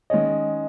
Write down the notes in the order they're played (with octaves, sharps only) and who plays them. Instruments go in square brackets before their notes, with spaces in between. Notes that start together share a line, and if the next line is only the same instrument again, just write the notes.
[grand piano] D#3 G#3 C#4 G#4 C#5 [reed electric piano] D#5